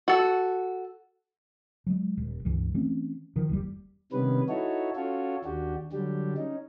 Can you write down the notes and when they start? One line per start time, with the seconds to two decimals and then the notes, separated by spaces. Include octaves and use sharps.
0.08 F#4 A4
1.87 F#3 G#3
2.17 D#1
2.45 C#2 G2 E3
2.74 E3 A3 C4 C#4
3.36 D#3 F3
3.49 F#1 D#2 C3 G3
4.12 C3 D#3 G3 B3 C#4 B4
4.49 D#4 E4 F#4 A4 C#5
4.96 C#4 F4 F#4 A4 C#5
5.45 D#2 D4 F#4 G4
5.93 D3 F#3 G3 D4 G4
6.37 C#4 D#4